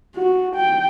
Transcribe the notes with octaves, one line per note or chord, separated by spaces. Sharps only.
F#4
G5